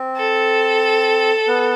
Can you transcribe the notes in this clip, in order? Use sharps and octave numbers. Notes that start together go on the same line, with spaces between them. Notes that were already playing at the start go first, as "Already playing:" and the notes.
Already playing: C4
A4
B3